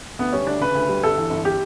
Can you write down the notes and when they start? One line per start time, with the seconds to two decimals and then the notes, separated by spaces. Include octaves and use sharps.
0.19 D2 B3
0.33 G3 C#4
0.47 D2 D4
0.60 C#3 B4
0.75 D2
0.89 G3
1.03 G1 A4
1.17 E3
1.30 G1
1.45 G4